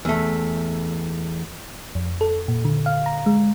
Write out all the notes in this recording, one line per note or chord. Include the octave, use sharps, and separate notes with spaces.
E2 A3
F2
A4
A#2
D3
F5
A#5
G#3